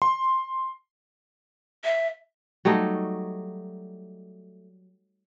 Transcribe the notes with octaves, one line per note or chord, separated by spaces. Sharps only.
C6
E5
F#3 G3 A3 D#4